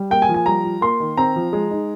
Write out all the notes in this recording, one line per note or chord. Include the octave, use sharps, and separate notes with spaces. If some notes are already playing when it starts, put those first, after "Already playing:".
Already playing: G3
A#3 G5
G#5
F3
G#5
G3 A#5
F4
A#3 C6
D#3
C4 A#5
F3
G#3
D#4